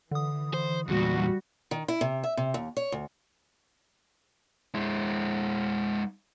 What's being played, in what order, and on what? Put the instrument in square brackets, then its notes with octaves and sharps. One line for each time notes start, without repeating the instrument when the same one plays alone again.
[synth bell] D3 D#6 [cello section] E3
[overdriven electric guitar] C5
[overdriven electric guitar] E2 A#2 [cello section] G3 F#4
[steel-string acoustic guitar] D#3
E4
C3
E5
C3
D#2
C#5
D2
[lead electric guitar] G#3 E4